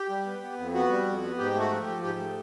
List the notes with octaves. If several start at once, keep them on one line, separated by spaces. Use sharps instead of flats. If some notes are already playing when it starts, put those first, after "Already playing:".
Already playing: G4
G3
B3
B3
F2
B3 F#4
G3
F2
B3
G#2 G4
A3 F#4
F3
G4
F3
G#2 G4
A3